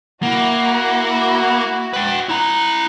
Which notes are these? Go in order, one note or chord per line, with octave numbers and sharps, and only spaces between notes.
A#3 E4 F#4
B4 G5
E4 A#5 F#6